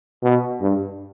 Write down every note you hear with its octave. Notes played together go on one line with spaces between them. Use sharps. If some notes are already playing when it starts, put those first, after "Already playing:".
B2
G2